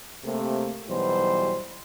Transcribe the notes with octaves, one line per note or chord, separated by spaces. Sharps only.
C3 A3 A#3
B1 B2 E3 F#3 G3 C5